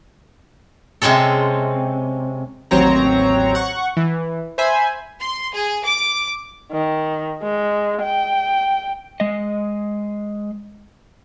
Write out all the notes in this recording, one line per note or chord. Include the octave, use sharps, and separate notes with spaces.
C3 G#3 C4 C#4 A4
A1 D#2 F#3 C4 C#5 A#5
F#5 C#6
E3
C5 E5 G#5 B5
C6
G#4
D6
D#3
G#3
G5
G#3 D#5